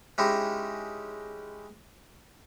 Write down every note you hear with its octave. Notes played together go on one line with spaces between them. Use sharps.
G#3 C#4 D#4 E4 G4